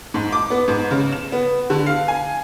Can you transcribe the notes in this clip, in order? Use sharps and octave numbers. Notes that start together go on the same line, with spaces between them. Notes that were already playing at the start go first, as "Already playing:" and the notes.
G#2
D6
B3
G#2
C#3
E7
B3
D3
F5
G#5